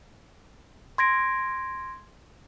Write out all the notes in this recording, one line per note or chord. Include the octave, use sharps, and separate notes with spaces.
C6 G#6 A#6 D7